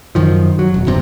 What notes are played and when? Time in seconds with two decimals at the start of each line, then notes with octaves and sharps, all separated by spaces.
0.15 F#2 D#3 F3
0.59 F#3
0.74 E1
0.87 E2 G2 C3